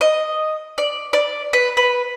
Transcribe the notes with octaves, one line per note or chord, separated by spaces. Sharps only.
D#5
D5
D5
B4
B4